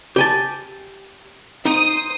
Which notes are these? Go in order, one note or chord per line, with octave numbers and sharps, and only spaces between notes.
G4 G#5 A5
D#4 C5 D#6